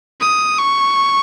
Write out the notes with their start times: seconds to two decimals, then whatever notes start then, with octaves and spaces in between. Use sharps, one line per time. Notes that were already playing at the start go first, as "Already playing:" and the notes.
0.21 D#6
0.58 C#6